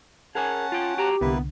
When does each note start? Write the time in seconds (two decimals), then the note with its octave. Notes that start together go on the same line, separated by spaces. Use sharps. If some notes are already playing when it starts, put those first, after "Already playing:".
0.35 C#4 G#4 A#4 F#5 G#5 A5
0.72 F4 G5
0.97 F#4 G4 G5 A#5
1.21 C2 D3 A#3 B3 E4 B4